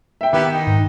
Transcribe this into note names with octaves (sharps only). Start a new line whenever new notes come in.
E5 G5
D#3 B3 E4 G4 G5
D#4
G#2